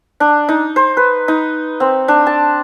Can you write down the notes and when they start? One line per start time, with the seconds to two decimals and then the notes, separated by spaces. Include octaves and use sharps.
0.20 D4
0.49 D#4
0.76 C5
0.97 B4
1.28 D#4
1.80 C4
2.08 D4
2.26 A5